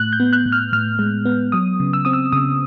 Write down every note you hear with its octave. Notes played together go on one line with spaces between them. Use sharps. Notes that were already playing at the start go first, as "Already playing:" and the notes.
Already playing: A2 F#6
G6
B3
F#6
A2
F6
A2 F6
G#3
B3
F#3 D#6
C#3
E6
C4 D#6
E6
C#3 D#6